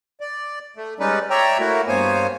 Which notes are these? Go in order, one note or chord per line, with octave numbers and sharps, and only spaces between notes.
D5
A3
G3 G#3 C#4 D#4 B4 D5
C#5 D5 E5 G5 A#5
A3 A#3 E4 F#4
G2 A#3 B3 C5 C#5 G#5